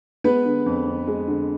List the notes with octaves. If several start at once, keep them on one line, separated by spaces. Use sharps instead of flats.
G#3 B3 B4
D3
F2
F2
G#3
D3